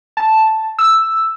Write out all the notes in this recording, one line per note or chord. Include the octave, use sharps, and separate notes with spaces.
A5
E6